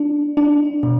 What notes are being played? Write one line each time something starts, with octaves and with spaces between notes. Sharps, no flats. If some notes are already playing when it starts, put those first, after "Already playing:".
Already playing: D4
D4
B2